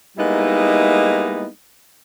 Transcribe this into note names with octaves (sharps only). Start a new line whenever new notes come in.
G3 G#3 A#3 B3 D#4 E4